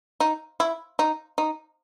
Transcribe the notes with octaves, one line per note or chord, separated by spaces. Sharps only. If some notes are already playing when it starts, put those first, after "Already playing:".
D#4
E4
D#4
D#4